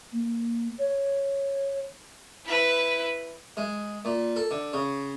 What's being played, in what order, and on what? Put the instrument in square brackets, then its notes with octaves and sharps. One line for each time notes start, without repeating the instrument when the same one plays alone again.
[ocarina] A#3
C#5
[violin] E4 B4
[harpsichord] G#3
A#2
A4
D3
C#3